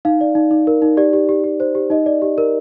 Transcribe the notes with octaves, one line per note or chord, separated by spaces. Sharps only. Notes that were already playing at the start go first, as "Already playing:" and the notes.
D#4 F5
D5
D#4
D#4
A#4
D#4
G4 D5
G4
G4
G4
C5
G4
D#4 D#5
D5
G4
A#4